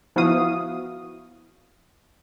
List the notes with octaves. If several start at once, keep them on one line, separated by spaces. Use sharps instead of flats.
F3 B3 E4 F#4 F5 D#6